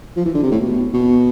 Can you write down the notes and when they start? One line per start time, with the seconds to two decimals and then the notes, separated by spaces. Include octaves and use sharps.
0.16 F3
0.25 E3
0.34 D3
0.43 C3
0.51 A2
0.60 B2
0.93 B2